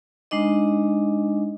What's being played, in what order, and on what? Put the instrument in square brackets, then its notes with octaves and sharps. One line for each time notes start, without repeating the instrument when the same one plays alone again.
[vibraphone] G#3 D4 D#4 D#5